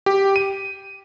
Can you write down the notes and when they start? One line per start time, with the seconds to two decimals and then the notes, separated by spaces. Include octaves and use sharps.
0.06 G4
0.36 D#7